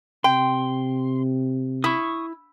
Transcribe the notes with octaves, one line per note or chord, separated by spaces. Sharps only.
C3 G5 C6
E4 C#6 D#6